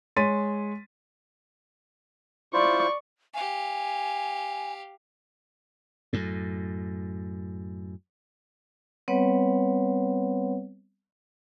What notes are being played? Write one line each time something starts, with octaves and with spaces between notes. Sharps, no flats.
G#3 C#5 C6 A6 B6 D#7
E4 F4 C5 D5 C#6
G4 F5 G#5
F#2 A2
G3 B3 C4 B4 C#5 F#5